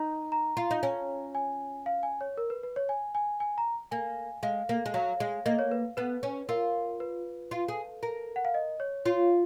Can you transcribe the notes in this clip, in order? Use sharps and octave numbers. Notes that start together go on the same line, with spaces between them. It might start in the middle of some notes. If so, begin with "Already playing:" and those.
Already playing: D#4 A#5
A#5
F4
D#4
C#4
G#5
F5
G#5
C#5
A#4
B4
B4
C#5
G#5
G#5
G#5
A#5
A#3 G#5
G#3 F5
A#3
G#3
F#3 F5
G#3
A#3 D#5
C#5
B4
B3 B4
C#4
F4 A#4
B4
F4
G#4
A#4
F#5
F5
D#5
C#5
F4 C#5